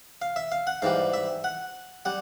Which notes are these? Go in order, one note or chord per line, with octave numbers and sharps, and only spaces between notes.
F5
E5
F5
F#5
G#2 E3 G3 F5
E5
F#5
G3 F#5